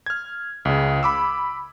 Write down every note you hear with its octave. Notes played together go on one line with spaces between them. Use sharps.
F6 G#6
C#2 C#3
B5 D6 E6